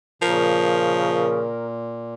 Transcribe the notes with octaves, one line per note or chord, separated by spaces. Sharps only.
A#2 C#3 F3 A#4